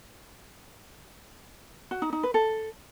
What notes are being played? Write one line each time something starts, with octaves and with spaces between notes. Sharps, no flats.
F#4
D#4
D#4
B4
A4